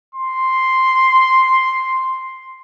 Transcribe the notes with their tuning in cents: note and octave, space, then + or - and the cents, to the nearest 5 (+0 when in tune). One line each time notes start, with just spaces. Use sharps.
C6 +0